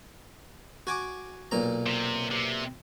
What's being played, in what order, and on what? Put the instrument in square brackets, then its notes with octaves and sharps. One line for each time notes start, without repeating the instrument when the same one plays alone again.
[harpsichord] F#4 G#5 D6
B1 A#2 A#5
[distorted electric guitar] C3
C3